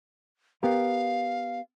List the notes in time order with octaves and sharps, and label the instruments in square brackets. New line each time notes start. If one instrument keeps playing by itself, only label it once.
[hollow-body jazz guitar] B3 G4 A#4 [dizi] F5